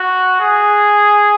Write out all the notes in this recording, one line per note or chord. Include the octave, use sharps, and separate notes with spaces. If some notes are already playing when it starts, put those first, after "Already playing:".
Already playing: F#4
G#4